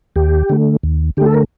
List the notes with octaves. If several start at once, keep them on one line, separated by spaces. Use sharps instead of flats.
D#2 G4
D3 A3
D#2
D3 A3 G4 A4
A#4